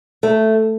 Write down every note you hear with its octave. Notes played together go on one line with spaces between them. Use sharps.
A3